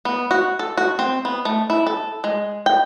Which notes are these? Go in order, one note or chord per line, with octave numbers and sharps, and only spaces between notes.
B3
F#4
A4
F#4
C4
B3
A3
E4
A4
G#3
G5